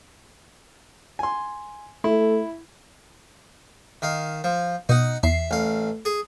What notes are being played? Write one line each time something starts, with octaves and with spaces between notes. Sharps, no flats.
G#5 C6
A3 E4
D#3 F5
F3
B2 D#4 F#5
E2 E5 C7
A1 F5
G#4